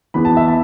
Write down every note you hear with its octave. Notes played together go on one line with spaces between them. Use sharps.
E2 E3 B3 B5
A5
E5
A5